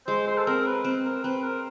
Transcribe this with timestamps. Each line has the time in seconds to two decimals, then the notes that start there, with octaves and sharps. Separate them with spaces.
0.07 G#3 C5
0.27 C5
0.38 A4
0.47 C4 A#4
0.66 B4
0.84 C4
1.05 A#4
1.24 C4 B4
1.43 A#4